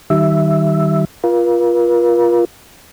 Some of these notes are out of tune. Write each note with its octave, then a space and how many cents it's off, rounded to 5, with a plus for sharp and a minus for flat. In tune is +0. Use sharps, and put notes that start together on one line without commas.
D#3 +0 G3 -30 E5 +0
F4 +0 A#4 +45